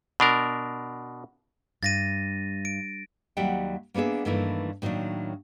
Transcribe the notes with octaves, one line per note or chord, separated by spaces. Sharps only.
B2 D4 A#4
G2 A6 A#6 D#7
D7
D#2 F#3 G3 E5 F#5 G5
A#3 B3 D4 G#4 E5
G2 D#3 E3 A3 A#3 E4
A2 D#3 F#3 A#3 D4